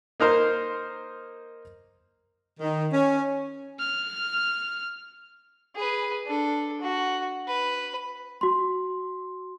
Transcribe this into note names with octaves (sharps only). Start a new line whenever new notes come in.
A#3 D#4 A#4 C5
D#3
C#4
F6
G#4 B4
D4 A4
F#4
B4
F#4 C6